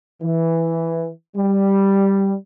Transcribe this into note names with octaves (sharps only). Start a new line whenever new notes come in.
E3
G3